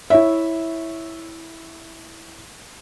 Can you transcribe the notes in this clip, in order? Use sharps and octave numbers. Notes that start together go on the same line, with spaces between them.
E4 C#5 E5